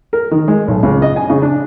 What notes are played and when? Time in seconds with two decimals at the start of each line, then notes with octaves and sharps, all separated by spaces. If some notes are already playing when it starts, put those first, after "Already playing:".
0.13 A#4
0.31 D#3
0.48 G#3
0.68 B1
0.83 C#2
1.02 D#5
1.16 G#5
1.30 C#3
1.42 D4